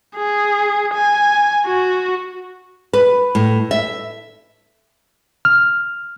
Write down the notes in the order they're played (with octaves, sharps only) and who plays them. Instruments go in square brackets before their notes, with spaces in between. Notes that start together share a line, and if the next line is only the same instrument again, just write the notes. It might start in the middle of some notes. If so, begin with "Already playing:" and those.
[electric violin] G#4
G#5
F#4
[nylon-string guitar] B4
A2
E5
[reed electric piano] F6